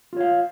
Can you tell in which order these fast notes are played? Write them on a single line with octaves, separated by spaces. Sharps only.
F4 C#5 F5